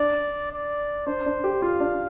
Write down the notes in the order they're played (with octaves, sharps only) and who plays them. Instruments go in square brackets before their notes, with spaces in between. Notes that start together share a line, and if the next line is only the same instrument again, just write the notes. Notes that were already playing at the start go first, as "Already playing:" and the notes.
Already playing: [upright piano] D4 [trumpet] D5
[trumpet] D5
[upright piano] D4 [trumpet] C5
[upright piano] D4
G4
[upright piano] F4 [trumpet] F5
[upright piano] D4